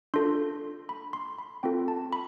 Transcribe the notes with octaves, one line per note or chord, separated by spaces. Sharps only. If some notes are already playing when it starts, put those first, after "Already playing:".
D4 F4 A4 C6
B5
C6
B5
C4 F4 A4 G5
A5
B5